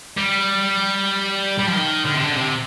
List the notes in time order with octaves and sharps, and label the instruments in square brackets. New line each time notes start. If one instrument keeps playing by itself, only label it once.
[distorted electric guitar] G3
G3
F3
D#3
D3
C3
D3
C3